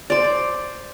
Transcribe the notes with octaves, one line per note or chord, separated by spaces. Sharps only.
C5 D5